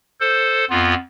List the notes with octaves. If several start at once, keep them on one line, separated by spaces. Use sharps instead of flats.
A4 C5
F2 B3 F4